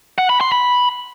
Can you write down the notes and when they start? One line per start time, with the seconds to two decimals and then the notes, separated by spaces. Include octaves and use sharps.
0.18 F#5
0.29 B5
0.41 C6
0.52 B5